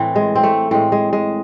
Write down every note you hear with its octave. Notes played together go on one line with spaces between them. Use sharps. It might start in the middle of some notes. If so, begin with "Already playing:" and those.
Already playing: A2 E3 C4
G#3
C4
A3
A2 G#3 C4
G#3
G#3